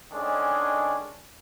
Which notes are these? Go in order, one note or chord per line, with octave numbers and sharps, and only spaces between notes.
D3 D#3 G#3 C#4 D4